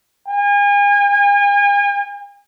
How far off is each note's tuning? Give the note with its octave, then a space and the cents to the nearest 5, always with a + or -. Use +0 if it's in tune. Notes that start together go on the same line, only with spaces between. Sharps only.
G#5 -40